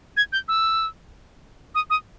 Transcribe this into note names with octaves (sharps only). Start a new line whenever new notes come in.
G#6
G6
E6
D#6
D#6